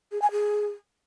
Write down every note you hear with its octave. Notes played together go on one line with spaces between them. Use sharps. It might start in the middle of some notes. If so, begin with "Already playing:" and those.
G#4
G#5
G#4